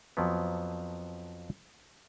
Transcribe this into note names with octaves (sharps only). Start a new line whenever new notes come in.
F2 F3 F#3 B3